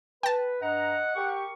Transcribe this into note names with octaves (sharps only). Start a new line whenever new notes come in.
B4 G5 A5
G2 D#5 F#5 A#5
G4 A#4 C#6